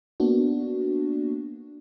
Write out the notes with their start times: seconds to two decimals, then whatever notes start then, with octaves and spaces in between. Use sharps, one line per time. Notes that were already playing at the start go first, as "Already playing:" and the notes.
0.20 A#3 B3 D4 F#4